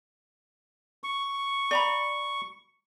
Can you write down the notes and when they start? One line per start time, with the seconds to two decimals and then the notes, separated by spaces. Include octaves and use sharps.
1.04 C#6
1.71 D5 A#5 B5